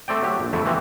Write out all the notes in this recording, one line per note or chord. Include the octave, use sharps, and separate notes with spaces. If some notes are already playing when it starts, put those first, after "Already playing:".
A3 C4 D5 G5
F#3 G4
A#1
F2 A3 E4
E3 F3 B3 C4 G4